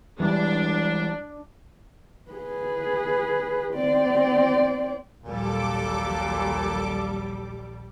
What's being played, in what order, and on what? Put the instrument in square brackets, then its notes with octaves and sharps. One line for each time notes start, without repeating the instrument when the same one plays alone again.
[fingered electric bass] E3 G3 G#3 [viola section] D4
[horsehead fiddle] G#4 B4
C4 D5
[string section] A#1 G3 [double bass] D#2 F#3 [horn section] A#2 [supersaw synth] A4 D6